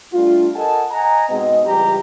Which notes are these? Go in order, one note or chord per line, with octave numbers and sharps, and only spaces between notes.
G3 A3 D4 F4
A4 A#4 D#5 F#5 G#5 A5
D#5 F#5 G#5 A#5
G#2 B2 G#3 C4 D#5
C#2 E3 G3 G4 A#5